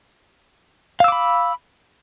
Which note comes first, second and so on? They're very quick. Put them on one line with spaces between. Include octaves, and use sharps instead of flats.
F5 E6 D6 B5